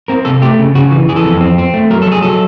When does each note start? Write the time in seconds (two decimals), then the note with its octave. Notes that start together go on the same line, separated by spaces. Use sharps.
0.08 C4 A#4
0.25 C3 A4
0.42 A3 G4
0.59 C#3
0.75 C#3 F#4
0.91 E3
1.09 E3 G#4
1.16 A4
1.24 F2
1.41 C4
1.58 C4
1.74 A3
1.90 F#3 A#4
2.02 A4
2.07 F#3 G#4
2.22 F#3 A4